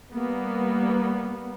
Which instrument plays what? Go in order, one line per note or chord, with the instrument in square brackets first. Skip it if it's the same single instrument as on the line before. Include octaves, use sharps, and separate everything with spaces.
[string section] G3 A#3 B3